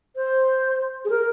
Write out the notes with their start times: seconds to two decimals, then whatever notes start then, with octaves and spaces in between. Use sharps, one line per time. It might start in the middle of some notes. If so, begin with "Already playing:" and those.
0.16 C5
1.05 G#4
1.10 A#4